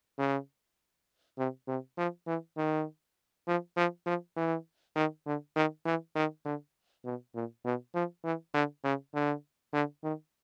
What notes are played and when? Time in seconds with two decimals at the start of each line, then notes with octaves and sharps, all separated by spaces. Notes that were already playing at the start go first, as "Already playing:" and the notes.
0.18 C#3
1.38 C3
1.68 C3
1.97 F3
2.27 E3
2.57 D#3
3.47 F3
3.77 F3
4.06 F3
4.36 E3
4.96 D#3
5.26 D3
5.56 D#3
5.85 E3
6.16 D#3
6.45 D3
7.05 B2
7.35 A#2
7.65 B2
7.94 F3
8.24 E3
8.54 D3
8.84 C#3
9.14 D3
9.73 D3
10.03 D#3